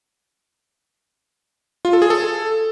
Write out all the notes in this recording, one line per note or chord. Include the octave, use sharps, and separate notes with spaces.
F4
A4
G#4
A4